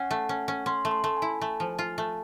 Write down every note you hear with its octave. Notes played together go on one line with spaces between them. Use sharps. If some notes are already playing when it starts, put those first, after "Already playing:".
Already playing: C#4 F#5
A3
C#4
C#4
C#4 C6
A3
C6
A3
G#5
E4
A3
F3
F4
A3